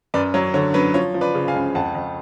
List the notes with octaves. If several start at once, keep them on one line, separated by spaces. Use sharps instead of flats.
F#2 B4 D5
F#3 C#5
D3 C#5
F#3 B4
F3 C#5
F3
B4 D5
C#3
F5 G#5
C#2
F2 F#5 A5
F2